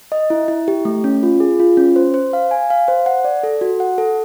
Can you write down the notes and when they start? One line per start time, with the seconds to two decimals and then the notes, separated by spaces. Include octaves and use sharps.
0.12 D#5
0.30 E4
0.48 E4
0.68 G4
0.85 A3
1.04 C#4
1.23 F4
1.40 G#4
1.60 F4
1.77 C#4
1.96 C5
2.14 C5
2.33 F5
2.51 G#5
2.70 F5
2.88 C5
3.06 F#5
3.24 D5
3.43 A4
3.61 F#4
3.80 F#5
3.98 A4